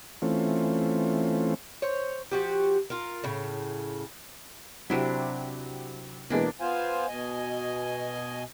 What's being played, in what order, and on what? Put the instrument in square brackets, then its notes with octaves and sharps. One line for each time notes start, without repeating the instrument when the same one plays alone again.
[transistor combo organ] E3 A3 C4 C#4 F4
[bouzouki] C5 C#5
F3 F#4 G4
F4 A#4
A2 C#3
[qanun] C3 D4 E4 [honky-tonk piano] F#3 G4
[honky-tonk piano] B2 E3 G#3 [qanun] A#3 D4
[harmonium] B3 F4 C5 F5 G#5
B2 D#5 G#5